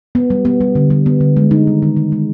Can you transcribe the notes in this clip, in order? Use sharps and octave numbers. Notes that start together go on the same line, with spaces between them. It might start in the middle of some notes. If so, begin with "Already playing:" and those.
B3
G3
B3
G3
D3
G3
B3
D3
G#3
D#4
D#3
D#3
D#3
G#3